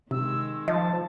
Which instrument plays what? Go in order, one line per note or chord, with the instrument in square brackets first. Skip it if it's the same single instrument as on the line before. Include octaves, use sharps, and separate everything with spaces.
[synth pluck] C3 [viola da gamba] D#3 G#3 [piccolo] E6
[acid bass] F3 [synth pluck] D#5 [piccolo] A5